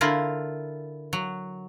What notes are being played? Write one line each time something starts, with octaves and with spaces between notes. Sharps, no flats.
D3 E4 F4 A#4
F#3